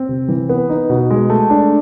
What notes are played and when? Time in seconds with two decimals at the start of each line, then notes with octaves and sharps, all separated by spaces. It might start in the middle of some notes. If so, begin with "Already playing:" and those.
Already playing: C4
0.09 C3
0.29 E3
0.49 B3
0.69 D#4
0.90 B2
1.10 G#3
1.30 A3
1.50 D4